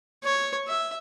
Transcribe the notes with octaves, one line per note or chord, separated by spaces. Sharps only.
C#5
E5